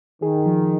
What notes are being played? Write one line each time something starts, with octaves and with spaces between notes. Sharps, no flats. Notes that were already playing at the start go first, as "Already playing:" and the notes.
D#3 G#4
F3